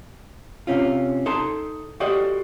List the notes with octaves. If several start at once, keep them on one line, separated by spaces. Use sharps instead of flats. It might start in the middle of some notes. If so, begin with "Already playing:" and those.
C3 C4 C#4 F4
D#4 A4 A5 A#5 C6
F#4 G4 A4 C5 D5 D#5